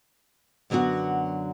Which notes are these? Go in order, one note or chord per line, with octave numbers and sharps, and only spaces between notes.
F#2 D3 F#3 B3 F#4